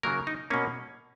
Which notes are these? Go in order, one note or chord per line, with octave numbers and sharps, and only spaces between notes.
C#3 F#3 A#3 A#4
D#4
B2 A#3 C#4